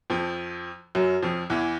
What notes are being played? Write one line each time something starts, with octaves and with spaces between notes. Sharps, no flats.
F2 F3
F#2 F#3
F2 F3
E2 E3